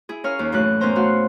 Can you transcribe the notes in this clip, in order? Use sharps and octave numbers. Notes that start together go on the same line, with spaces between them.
E4 G#4
C#4 A#4 C#5 F5 F6
D#2
F#2 A2 E3 A3 C#4 F#6
A2 B3 C#4 A#4 C5 A#5
A3 F#4 F5 F#5